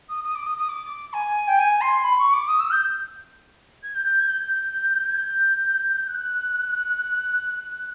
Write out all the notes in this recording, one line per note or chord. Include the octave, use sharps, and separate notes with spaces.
D#6
D#6
D6
D#6
D#6
D6
G#5
G5
G#5
C6
B5
C#6
D6
D#6
E6
G6
G#6
G6
G6
G#6
G6
G#6
G6
F#6